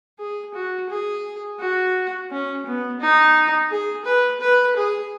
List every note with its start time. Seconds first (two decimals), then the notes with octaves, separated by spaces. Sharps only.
0.19 G#4
0.54 F#4
0.89 G#4
1.60 F#4
2.31 C#4
2.66 B3
3.00 D#4
3.71 G#4
4.05 B4
4.41 B4
4.76 G#4